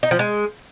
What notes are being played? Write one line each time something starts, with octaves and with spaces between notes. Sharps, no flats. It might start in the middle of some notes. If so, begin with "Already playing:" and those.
D#4
F3
G#3